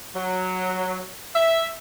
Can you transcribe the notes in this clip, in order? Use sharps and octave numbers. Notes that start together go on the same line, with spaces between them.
F#3
E5